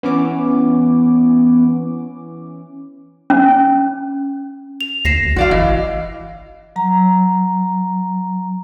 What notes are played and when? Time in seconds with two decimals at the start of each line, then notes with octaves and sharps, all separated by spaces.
0.03 E3 B3 C#4 D6
3.30 C#4
4.81 F7
5.05 D#2 A#6 C7 E7
5.25 D2
5.36 B1 F#4 D5 F5
5.51 G1 E3 D#5
6.76 F#3 A#5